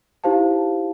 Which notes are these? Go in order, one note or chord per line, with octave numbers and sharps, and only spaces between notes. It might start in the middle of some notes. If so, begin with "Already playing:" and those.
D#4 E4 G4 C5 F5 A5